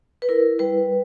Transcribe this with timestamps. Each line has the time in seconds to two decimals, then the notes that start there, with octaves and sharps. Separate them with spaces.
0.22 B4
0.29 E4 A#4
0.59 G3 B4